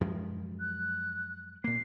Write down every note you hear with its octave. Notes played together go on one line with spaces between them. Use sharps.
F#2 F3 G#3
F#6
A#2 A#3 C7